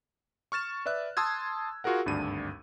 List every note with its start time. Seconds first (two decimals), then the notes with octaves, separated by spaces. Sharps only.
0.52 C#6 F6 A6 E7
0.86 B4 D5 E5 F#6
1.17 A5 C6 D#6 E6 G#6
1.84 F4 F#4 G#4 A#4 F#5
2.06 G#1 D2 G2 D4 D#7